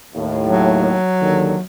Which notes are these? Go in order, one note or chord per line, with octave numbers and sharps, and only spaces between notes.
D#2 A2
F#3
D#2 D3 D#3